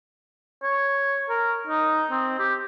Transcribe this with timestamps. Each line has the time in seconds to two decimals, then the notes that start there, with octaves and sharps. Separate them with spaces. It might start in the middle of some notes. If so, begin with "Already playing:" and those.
0.63 C#5
1.30 A#4
1.67 D#4
2.11 C4
2.39 G4